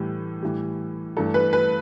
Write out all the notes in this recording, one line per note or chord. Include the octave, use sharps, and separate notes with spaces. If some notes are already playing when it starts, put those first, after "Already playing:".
Already playing: A2 E3 G3
A2 E3 G3
G2 E3 A3 A4
B4
B4